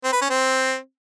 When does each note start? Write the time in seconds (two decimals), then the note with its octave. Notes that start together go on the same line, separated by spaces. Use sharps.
0.04 C4
0.13 B4
0.21 C#4
0.30 C4